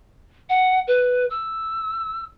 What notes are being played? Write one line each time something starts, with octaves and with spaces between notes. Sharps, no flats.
F#5
B4
E6